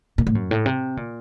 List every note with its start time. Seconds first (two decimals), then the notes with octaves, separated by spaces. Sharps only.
0.18 A#2
0.27 A2
0.35 F#2
0.51 A2
0.66 C3
0.97 A#2